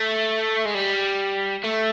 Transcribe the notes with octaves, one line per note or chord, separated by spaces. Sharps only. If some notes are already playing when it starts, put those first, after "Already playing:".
Already playing: A3
G#3
G3
A3